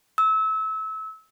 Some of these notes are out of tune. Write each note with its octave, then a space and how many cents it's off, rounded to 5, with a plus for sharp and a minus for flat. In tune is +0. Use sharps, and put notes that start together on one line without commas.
E6 -25